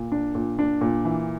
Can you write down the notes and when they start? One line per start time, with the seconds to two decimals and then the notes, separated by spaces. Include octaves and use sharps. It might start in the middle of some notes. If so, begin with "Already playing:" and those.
Already playing: A#2
0.12 D4
0.35 A#2
0.59 D4
0.81 A#2
1.05 E3